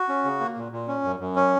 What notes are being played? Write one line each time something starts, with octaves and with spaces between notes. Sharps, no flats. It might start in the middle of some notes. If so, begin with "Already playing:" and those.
Already playing: F#4
C#4
C#3
A#3
A#2
A#2
C#4
F#2
F#2
C#4